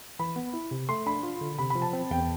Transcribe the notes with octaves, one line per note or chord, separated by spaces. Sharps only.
E3 B5
B3
E4
C3
A3 C6
D4 B5
F4
D3
C3 B5
F3 B5
A5
C4
E2 G5